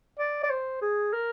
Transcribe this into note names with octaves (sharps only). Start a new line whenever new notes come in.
D5
D5
C5
G#4
A#4